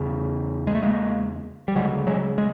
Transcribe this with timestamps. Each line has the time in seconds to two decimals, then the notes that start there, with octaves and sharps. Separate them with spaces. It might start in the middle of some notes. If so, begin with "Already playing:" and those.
Already playing: E2 C#3
0.67 G#3
0.75 A3
0.83 G#3 A#3
1.68 G3
1.76 D2 C#3 F#3 G#3
2.07 F#3 G#3
2.38 G#3